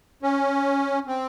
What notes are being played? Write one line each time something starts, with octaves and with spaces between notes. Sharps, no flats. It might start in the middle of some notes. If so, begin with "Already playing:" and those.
C#4
C4